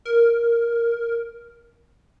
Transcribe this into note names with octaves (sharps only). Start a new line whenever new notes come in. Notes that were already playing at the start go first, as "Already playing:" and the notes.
A#4